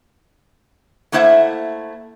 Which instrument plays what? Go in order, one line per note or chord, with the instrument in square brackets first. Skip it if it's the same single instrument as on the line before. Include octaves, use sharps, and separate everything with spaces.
[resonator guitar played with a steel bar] A3 A#3 E4 C5 E5 F#5